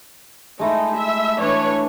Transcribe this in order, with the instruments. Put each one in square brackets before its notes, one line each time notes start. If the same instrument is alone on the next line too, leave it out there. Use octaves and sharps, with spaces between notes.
[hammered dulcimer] G#3 A3 E4 [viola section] D#4
[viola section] E5
[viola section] E3 B4 C#5 [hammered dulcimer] D4 D5